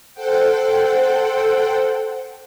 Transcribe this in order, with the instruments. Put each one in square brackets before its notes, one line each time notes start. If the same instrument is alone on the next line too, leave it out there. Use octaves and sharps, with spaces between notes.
[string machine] A4 C5 F#5 G5